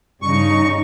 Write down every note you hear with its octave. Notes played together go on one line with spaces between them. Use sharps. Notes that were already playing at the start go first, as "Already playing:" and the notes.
G2 C#3 D#4 C#6